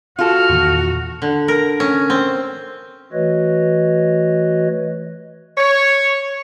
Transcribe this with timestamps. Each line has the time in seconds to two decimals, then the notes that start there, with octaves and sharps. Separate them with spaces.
0.19 F4 F#4 A4 F6
0.49 E2 A#2 D#3
1.22 D3
1.48 A#4
1.80 C#4
2.10 C4
3.12 E3 A3 F#4 B4 C#5 D#5
5.58 C#5